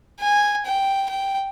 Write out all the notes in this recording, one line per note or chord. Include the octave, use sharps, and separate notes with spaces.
G#5
G5
G5